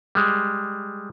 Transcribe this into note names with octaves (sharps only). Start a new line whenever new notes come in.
G3 G#3